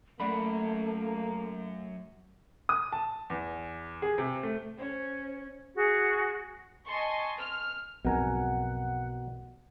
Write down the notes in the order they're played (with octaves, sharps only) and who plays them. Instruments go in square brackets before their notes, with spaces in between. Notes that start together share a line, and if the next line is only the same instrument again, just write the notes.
[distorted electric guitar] F#2 [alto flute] A3 [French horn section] A#3 [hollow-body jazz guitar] D5 F#5 B5
[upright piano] D#6
A5
E2
G#4
C3
A3
[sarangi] C#4 [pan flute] C5
[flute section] F#4 G#4
[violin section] D#5 G#5 A5 C6 C#6
F6
[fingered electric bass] B1 F2 G#2 [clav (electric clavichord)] B2 A#4 G#5 [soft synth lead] F#5